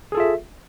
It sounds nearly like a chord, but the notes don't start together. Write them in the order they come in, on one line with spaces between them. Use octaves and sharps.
G#4 A4 F4 E5